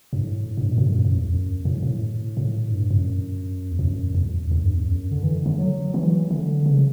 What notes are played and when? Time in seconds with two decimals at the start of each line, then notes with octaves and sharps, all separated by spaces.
0.13 G2
0.22 A2
0.57 G2
0.71 B2
0.78 A2
0.85 G2
0.93 F#2
1.05 F#2
1.17 E2
1.28 F#2
1.65 A2
1.82 A2
2.37 A2
2.71 G2
2.91 F#2
3.71 E2
3.79 F#2
4.15 E2
4.51 E2
4.63 G2
4.74 E2
4.87 F#2
5.11 D3
5.23 E3
5.34 D3
5.46 D3
5.59 F#3
5.94 E3
6.31 D3
6.66 C#3